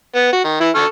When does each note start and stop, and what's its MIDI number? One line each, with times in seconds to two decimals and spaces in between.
0.15 0.32 59
0.33 0.40 66
0.44 0.59 51
0.60 0.69 52
0.60 0.69 64
0.75 0.85 69
0.75 0.85 85
0.75 0.85 89